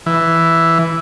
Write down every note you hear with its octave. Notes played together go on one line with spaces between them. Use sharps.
E3